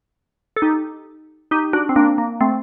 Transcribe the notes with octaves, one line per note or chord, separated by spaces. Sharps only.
A4
D#4 G4
D#4 G4
D4 F#4
C4
A#3 D4
A#3
A3 C4